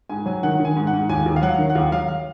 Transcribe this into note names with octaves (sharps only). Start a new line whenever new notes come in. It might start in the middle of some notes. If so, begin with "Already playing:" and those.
G#2 G#5
F#3 G#5
D#3 F#5
D#3
G#5
G#2
F#5
G#2
D#2 G#5
D#2
F5
F#3 F#5
D#3
F#5
D#2 F5
F#3 F5
F5